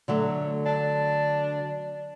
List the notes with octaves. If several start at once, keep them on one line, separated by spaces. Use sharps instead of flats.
D3 F#3 A3
D4